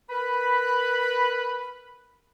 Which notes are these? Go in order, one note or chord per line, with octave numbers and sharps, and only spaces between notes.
A#4 B4 B5